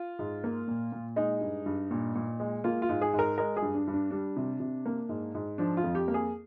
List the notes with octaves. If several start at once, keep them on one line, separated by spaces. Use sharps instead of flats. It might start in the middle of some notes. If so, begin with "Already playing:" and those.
Already playing: F4
G#2
A#3
A#2
A#2
G#3 D#4
G2
G2
A#2
A#2
G#3
A#3 F4
F4
G#2
G#4
G#2
A#4
G#3 A#4
G#4
G2
D4
G2
D4
G3 D4
C3
C3
A#3
G#2
G#2
F3 D4
F4
F2
G4
A#3
G#4